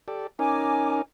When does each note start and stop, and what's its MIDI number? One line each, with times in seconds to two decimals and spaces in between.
0.08 0.27 67
0.08 0.27 69
0.08 0.27 74
0.39 1.02 61
0.39 1.02 63
0.39 1.02 70
0.39 1.00 80
0.39 1.00 86